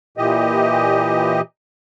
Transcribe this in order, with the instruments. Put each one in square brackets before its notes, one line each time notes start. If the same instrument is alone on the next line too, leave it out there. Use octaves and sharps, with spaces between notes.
[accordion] A#2 E3 G4 D#5